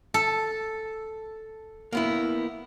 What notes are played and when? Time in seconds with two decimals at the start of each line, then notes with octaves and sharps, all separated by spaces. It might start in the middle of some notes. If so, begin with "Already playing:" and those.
0.14 A4
1.93 A#3 B3 E4